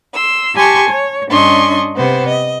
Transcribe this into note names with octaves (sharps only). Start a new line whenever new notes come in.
C6 E6
G4 G#5 A5 C6 C#6
C#5
G2 C#4 D4 D#5 C6 C#6
C3 B3 C5
D#5